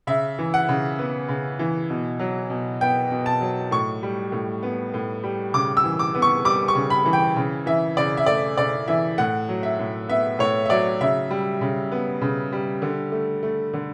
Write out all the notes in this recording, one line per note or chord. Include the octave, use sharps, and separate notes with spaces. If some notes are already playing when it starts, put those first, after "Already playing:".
C#3 E5
E3
F#5
C#3
B3
C#3
E3
B2
F#3
B2
B3 G5
B2
A5
F#3
A2 C#6
G3
A2
B3
A2
G3
C#3 D6
E6
E3
D6
B3
C#6
G3 D6
C#6
C#3
B5
E3
G5
C#3
E3 E5
C#3 D5
E5
A3 D5
C#3 D5
E3 E5
A2 F#5
F#3
E5
A2
B3 E5
A2 C#5
E5
F#3 D5
C#3 E5
G3
C#3
B3
C#3
G3
D3
A3
A3
D3